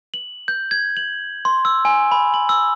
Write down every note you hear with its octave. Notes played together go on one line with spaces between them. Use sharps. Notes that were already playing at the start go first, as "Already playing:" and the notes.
F#7
G6
G#6
F#7
C6
E6
G#5
B5
F#7
E6